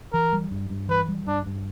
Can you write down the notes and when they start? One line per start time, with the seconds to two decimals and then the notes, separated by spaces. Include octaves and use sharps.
0.13 E3 A#4
0.33 G3
0.51 G2
0.70 G2
0.89 E3 B4
1.08 G3
1.27 G2 D4
1.46 G2